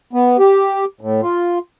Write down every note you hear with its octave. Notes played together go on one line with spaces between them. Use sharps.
B3
G4
A2
F4